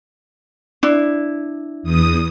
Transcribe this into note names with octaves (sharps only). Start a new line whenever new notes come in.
D4 E4
E2 D#6